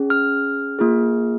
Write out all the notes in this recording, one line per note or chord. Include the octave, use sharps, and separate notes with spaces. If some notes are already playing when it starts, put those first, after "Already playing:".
Already playing: C#4 G#4
F6
A#3 F4 G#4